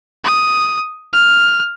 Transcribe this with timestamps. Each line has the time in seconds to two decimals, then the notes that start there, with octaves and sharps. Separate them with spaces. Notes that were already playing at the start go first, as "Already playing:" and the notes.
0.24 D#6
1.13 F6